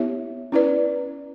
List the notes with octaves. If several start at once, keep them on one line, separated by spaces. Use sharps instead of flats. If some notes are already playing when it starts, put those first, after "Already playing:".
Already playing: B3 E4 G4 C#5 E5
C#4 E4 B4 D5